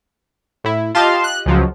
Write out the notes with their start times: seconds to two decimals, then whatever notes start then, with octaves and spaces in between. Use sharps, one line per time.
0.64 A2 E4
0.95 F4 G4 D#5 F5 A5 C6
1.24 F#6
1.46 C#2 F3 F#3